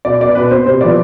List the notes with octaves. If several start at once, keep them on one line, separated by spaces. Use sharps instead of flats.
B2 D5
B3 D5
B2 B4
B3 C5
C3 C5
F3 B3 D5